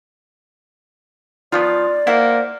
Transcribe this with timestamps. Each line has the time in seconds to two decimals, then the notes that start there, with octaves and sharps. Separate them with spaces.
1.52 D#3 F3 B3 F4 D5
2.07 A#3 E4 C5 F#5